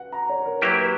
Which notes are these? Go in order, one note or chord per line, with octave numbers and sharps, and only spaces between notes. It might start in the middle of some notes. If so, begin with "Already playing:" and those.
Already playing: F#4 B4 F#5
A#5
C#5
A#4
F#3 A#3 E4 G4 B4
A#4
B4